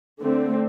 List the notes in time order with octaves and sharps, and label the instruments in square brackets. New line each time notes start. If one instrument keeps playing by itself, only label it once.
[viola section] D3 A3 C4